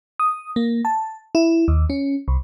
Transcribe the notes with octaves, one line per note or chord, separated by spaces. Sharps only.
D#6
A#3
A5
E4
D#2
C#4
C2